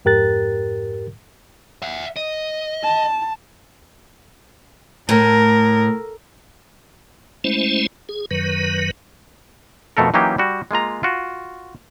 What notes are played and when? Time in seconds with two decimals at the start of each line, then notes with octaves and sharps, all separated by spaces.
0.05 F2 G#2 G4 A#4 F#6 A6
1.82 E5 F#5
2.16 D#5
2.83 A5
5.09 A2 A#4
7.44 G#3 A3 C#4 E4 C5
8.09 G#4
8.31 F#2 D#3 F#3 B4
9.97 F2 B2 A3 A4 A#4
10.14 E3 F#3 A#3 C#4 D#4 G4
10.38 G3 F#4
10.71 G#3 A#3 F4 A#5
11.03 F4 F#4